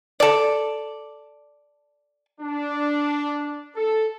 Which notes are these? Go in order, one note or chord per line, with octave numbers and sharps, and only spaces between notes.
A4 D5
D4
A4